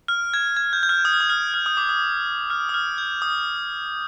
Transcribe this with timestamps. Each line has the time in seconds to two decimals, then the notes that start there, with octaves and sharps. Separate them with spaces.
0.08 F6
0.34 G#6
0.57 G#6
0.73 G6
0.83 G6
0.89 F6
1.05 D#6
1.14 F6
1.20 D#6
1.30 F6
1.54 F6
1.66 D#6
1.77 D6
1.89 D#6
2.50 F6
2.69 D#6
2.74 F6
2.98 G6
3.22 D#6